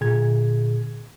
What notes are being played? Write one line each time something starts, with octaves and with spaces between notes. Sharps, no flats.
A#2 D3 G#4 G#6